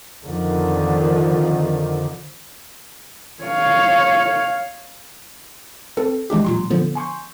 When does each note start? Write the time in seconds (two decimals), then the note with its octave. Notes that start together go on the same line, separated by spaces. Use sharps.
0.24 F2 D3 D#3 F3
3.44 C#5 F5
5.97 C4 A4 B4
6.30 E3 G#3 D4 G4
6.45 A#2 F#3 C6
6.70 D3 F3 B3
6.95 G#5 C6 C#6 G6